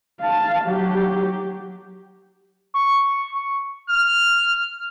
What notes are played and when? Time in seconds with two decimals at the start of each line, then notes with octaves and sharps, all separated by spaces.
0.20 F5 A5
0.64 F#3 G4
2.74 C#6
3.89 F6